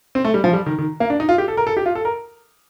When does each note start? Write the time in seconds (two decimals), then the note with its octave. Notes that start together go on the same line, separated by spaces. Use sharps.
0.15 C4
0.24 A3
0.34 G3
0.44 F3
0.53 G3
0.66 D#3
0.79 D#3
1.00 A#3
1.10 D4
1.20 D#4
1.29 F4
1.38 G4
1.48 A4
1.57 A#4
1.67 A4
1.77 G4
1.86 F4
1.95 A4
2.05 A#4